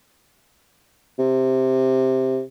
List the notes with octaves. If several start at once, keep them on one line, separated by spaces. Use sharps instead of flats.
C3